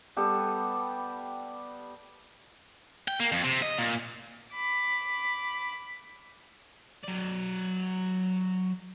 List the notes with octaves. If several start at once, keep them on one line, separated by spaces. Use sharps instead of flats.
G3 B3 G4 A4
G5
A#3
F2
C3
D#5
A#2
B5 D6
F#3 D5